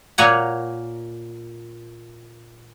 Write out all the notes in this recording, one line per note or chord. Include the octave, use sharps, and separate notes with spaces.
A#2 A#3 C#5 F#5 G#5 A#5